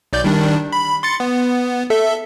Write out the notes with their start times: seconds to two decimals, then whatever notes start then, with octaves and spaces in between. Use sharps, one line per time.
0.13 B1 D5 G6
0.24 D#3 G3 D4
0.73 B5
1.03 C6 A6 C#7
1.20 B3
1.90 A4 E5